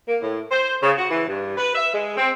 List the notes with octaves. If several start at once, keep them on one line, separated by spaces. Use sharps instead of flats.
A#3
A2
C5
C#3
F#4
E3
G2
B4
E5
G#3
C4